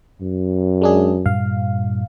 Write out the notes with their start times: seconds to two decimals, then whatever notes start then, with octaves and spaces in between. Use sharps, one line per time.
0.22 F#2
0.82 G#3 D4 G#4
1.26 G2 A#2 G3 F5